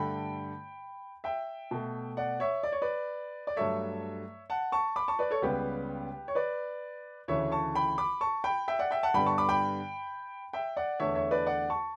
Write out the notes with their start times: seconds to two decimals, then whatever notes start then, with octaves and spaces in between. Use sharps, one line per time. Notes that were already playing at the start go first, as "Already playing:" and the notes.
Already playing: G2 D3 A3 G5 B5
1.24 E5 G5
1.71 B2 A3
2.17 D5 F#5
2.40 C#5 E5
2.63 D5
2.72 C#5
2.82 B4 D5
3.47 D5
3.57 G2 F#3 A3 C#5 E5
4.50 F#5 A5
4.72 A5 C#6
4.96 B5 D6
5.08 A5 C#6
5.19 B4 D5
5.31 A4 C#5
5.42 C#2 C#3 G3 B3 G4 B4
6.28 C#5
6.35 B4 D5
7.28 D2 C#3 E3 A3 C#5 E5
7.52 A5 C#6
7.75 G5 B5
7.98 B5 D6
8.21 A5 C#6
8.44 G5 B5
8.68 E5 G5
8.79 D5 F#5
8.91 E5 G5
9.03 F#5 A5
9.14 G2 D3 G3 B3 G5 B5
9.26 A5 C#6
9.38 B5 D6
9.49 G5 B5
10.53 E5 G5
10.77 D5 F#5
11.00 E2 D3 A3 C#5 E5
11.15 C#5 E5
11.31 B4 D5
11.46 D5 F#5
11.70 A5 C#6